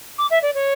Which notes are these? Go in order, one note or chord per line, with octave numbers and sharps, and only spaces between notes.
D6
E5
D5
C#5